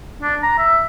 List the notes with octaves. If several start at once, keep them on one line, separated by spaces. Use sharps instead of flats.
D4
A#5
E5